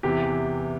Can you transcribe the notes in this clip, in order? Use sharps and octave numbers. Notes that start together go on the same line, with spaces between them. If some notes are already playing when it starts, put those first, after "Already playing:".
E2 C3 E3 G4